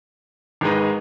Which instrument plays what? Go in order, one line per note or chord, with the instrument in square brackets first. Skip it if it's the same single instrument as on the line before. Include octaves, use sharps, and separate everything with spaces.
[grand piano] G#1 G#2 G#3 D#4 B4